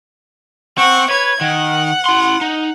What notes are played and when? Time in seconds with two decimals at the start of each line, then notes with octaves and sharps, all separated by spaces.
0.78 C4 F#5 C#6
1.11 B4 C#5 G#6
1.41 D#3 F#5
2.06 E4 C6
2.41 D#4